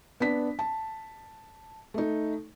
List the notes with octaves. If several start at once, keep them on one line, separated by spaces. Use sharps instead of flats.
B3 D4 B6
A5
A3 D#4